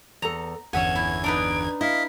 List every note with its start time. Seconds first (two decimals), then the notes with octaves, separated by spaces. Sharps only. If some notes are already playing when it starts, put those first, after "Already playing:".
0.22 E2 A4 A#5
0.73 G1 E2 C#4 E5 F#5 G#5 G#6
0.96 E4
1.24 D4 D#4 B4 D7
1.81 E4 D#5 F5 B6